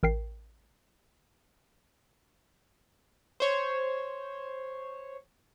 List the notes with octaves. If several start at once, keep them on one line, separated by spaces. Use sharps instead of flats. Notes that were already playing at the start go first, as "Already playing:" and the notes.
A1 A#4 G5 C7
C5 C#5